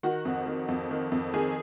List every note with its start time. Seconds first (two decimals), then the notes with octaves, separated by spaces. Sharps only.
0.03 D#3 F#4 F#5
0.25 F2
0.47 D#3
0.68 F2
0.91 D#3
1.12 F2
1.34 D#3 G#4 G#5